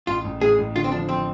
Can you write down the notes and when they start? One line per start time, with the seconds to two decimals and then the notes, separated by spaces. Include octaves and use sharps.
0.07 A1 F4
0.24 A1
0.41 A2 G#4
0.58 A1
0.75 D3 F4
0.84 C4
0.92 F3 D4
1.09 F3 C4